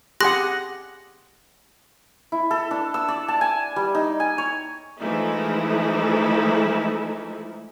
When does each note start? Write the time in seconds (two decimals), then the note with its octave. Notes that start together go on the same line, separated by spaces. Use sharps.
0.20 G4 G#4 F#5 C6 F#6 A#6
2.32 E4
2.51 A4
2.71 D4
2.94 E6
3.08 D5
3.28 A5
3.41 G#5
3.76 G3
3.95 D#4
4.20 G#5
4.38 C#5
5.00 E3 F3 G#3 A3 D#4 E4